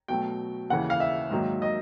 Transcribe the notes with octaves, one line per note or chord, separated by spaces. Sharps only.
B2 F#3 A3 G5
D#2 C#3 E3 F#5
F5
E5
G#2 D#3 F#3 A#3
D#5